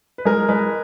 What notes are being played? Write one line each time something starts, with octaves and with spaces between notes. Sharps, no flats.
B4
G#3 A#4
G#3 B4